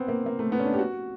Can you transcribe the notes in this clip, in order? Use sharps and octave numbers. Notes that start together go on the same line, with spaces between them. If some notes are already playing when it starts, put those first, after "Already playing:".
Already playing: B3 C4
A#3
A#3
A3
B3
C#4
D4
G4
F#4